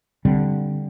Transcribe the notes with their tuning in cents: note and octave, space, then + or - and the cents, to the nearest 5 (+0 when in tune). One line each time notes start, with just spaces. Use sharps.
D3 +0 G3 +0 C4 +0